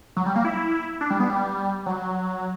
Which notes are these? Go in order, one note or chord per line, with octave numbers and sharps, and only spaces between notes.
F#3
G3
A#3
E4
D4
G3
B3
G3
F#3